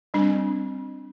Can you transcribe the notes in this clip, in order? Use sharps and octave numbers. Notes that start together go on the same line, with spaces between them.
G3 C4 D4